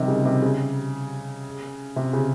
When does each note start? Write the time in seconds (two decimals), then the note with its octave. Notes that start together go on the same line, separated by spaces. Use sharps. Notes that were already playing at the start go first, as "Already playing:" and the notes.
Already playing: C3 D#3 F3 G3
0.08 C#3
0.25 C3
0.42 C#3
1.96 C3
2.13 C#3